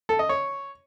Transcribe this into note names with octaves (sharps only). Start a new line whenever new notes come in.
A4
D#5
C#5